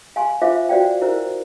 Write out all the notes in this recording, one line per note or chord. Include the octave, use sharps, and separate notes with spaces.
F5 G#5 C6
F4 C5 E5 F5 D6
F#4 C5 D5 F5 G5
E4 A#4 C5